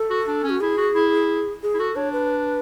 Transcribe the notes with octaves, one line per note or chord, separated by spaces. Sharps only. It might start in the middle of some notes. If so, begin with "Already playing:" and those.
Already playing: A4
F#4
D4
C#4
F#4
E4 G#4
F#4
E4
G#4
E4
F#4 A4
D4 C#5
B4